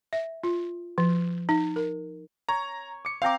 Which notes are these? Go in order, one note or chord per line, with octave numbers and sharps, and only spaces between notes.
E5
F4
F3
D#4
A#4
C#5 A#5
D6 C#7
C4 F5 G5 A#5 D6